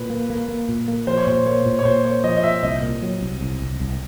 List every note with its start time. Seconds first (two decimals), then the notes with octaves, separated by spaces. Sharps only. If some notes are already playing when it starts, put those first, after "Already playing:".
Already playing: A#2 B4
0.10 A#3
0.30 A#3
0.48 A#3
0.69 A#2
0.88 A#3
1.07 F3 C5
1.17 C#5
1.27 A#2 C5
1.46 A#3 C#5
1.66 A#2
1.79 C#5
1.85 A#2 C5
2.04 A#3 C#5
2.24 F3 D#5
2.37 D#5
2.44 A#2 E5
2.63 C2 D#5
2.82 A#2
3.02 F#3
3.21 C2
3.41 C2
3.61 C2
3.80 C2